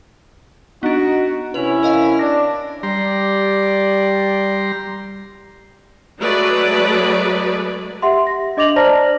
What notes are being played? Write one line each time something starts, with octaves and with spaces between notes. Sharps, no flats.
B3 D4 D#4 F#4
C3 C#4 E4 B4 F7
A#4 D#5 F5
D4 A#6
G3 G4 D5 A#5 C6
F#3 G#3 A3 G#4 B4 D5
G4 E5 F#5 C6
A#6
D4 D#5 D6 A#6 F7 F#7
C5 D5 A5 A#5 F6 A#6